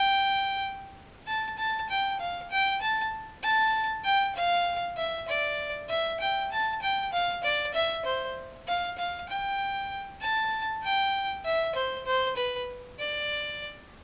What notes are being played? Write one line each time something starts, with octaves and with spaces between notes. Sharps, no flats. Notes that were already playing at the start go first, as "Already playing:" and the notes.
Already playing: G5
A5
A5
G5
F5
G5
A5
A5
G5
F5
E5
D5
E5
G5
A5
G5
F5
D5
E5
C5
F5
F5
G5
A5
G5
E5
C5
C5
B4
D5